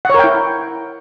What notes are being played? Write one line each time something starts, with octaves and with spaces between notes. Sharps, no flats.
E4 A#4 C#5 F#5 G5